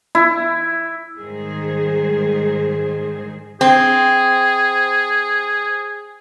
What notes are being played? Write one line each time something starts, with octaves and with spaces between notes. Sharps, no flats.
E4
G#2 D#3 G3 G#4 C5
C4 G#4